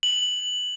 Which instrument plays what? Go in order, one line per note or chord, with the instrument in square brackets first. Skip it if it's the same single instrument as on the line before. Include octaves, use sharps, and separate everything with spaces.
[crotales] F#7